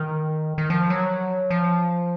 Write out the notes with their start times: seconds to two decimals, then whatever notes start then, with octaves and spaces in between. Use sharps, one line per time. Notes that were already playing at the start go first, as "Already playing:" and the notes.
Already playing: D#3
0.58 D#3
0.70 F3
0.90 F#3
1.50 F3